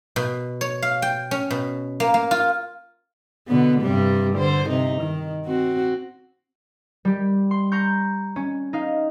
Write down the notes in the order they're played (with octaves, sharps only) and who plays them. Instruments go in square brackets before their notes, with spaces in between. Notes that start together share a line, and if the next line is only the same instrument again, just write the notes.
[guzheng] B2
C#5
F5
G5
C#4
B2
A#3
A#3
F4
[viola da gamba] B2 D3 B3
G2 C3 G3
D3 C5
C3 D#4
D#3
C4 F#4
[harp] G3 G4
C6
A#5 C6 C#6 G6
C#4
D#4 F5